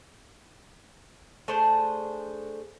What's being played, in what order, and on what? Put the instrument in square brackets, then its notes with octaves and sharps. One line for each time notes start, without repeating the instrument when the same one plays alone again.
[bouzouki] A3 D4 G#4 C5